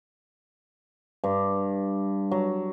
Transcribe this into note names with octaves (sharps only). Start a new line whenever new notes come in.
G2
F#3